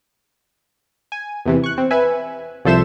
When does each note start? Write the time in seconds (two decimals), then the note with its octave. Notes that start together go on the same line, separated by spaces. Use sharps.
1.12 G#5
1.46 E2 C3 E3
1.64 C#6 F#6
1.78 C4
1.91 B4 E5 G#5
2.65 C2 F3 A4 C5 E5 E7